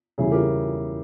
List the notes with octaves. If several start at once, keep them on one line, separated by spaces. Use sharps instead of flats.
E2 C#3 G3 E4 G#4
G4 A#4